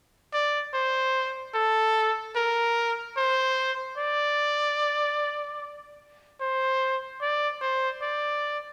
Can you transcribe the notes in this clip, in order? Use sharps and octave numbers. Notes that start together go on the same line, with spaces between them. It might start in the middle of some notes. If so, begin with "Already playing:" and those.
D5
C5
A4
A#4
C5
D5
C5
D5
C5
D5